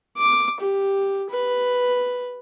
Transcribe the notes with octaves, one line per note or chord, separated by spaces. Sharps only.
D6
G4
B4